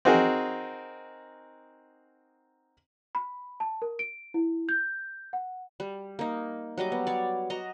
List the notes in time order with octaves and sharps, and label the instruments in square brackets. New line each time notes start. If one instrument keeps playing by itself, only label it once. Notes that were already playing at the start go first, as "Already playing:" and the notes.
[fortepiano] C4 D#4 F#4 G#4 A#4
[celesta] B5
A5
A#4
D7
E4
G6
F#5
[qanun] G3
A#3 D#4
F#3 G3 D#5 D6
B3
C#5 D5
F#4 D#5 A#5